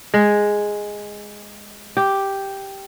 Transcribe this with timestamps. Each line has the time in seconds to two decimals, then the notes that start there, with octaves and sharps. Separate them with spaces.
0.14 G#3
1.97 G4